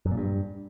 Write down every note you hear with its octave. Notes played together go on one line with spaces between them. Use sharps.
F#2
A#2
G2